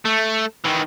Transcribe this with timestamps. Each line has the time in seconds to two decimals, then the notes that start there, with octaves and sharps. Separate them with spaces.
0.05 A3
0.65 D#3 E3